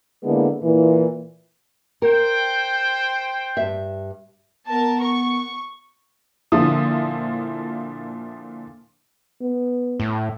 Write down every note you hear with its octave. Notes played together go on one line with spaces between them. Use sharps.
D3 G#3 A#3 B3 E4
A#2 E3
A#4 C5 G5
G2 E5
B3 A#4 A5
C#6
A#2 D3 F3 E4 D#6
B3
A2